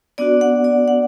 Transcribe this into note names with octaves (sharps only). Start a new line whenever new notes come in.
B3 D4 F#4 D5
F#5
D5
F#5